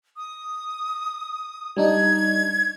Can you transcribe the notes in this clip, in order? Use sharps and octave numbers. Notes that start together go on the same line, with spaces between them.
D#6
G3 D4 D#4 G#6